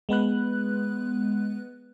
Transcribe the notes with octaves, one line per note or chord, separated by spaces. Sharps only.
G#3 B3 B4 F#6